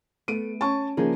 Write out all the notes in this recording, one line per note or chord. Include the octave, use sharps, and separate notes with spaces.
A3 B3 D7 D#7
C#4 A5 C#6
C#3 F3 A#3 C#4 D#4 G#4